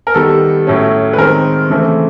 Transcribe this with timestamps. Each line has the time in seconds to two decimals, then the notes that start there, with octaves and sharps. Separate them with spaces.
0.07 A#4
0.14 D#3 G3 B3 A4
0.67 A2 F#3 A3 C#4
1.13 B4
1.18 D#3 G#3 C4 A#4
1.70 C#3 E3 A3 C4